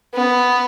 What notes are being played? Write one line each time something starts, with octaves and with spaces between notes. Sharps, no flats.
B3